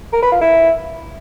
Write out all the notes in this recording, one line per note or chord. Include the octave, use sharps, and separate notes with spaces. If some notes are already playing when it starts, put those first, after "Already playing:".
A#4
B4
F4
E4